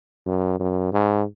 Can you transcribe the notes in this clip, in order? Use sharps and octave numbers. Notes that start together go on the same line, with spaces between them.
F#2
F#2
G#2